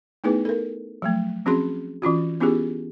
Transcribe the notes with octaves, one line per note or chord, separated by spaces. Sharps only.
A3 B3 D#4 E4 G#4 B4
A4 A#4
F3 F#3 A3
F3 C4 C#4 F#4 G#4 C6
E3 C#4 F4 F#4
B3 C#4 E4 F4 G4 G#4